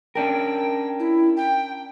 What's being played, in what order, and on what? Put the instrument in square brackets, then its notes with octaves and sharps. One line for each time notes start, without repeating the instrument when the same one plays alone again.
[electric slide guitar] C#4 D4 A#4 [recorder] G5
[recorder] E4
G5